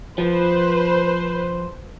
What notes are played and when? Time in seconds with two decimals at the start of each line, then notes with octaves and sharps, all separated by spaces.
0.18 F3 B4 C5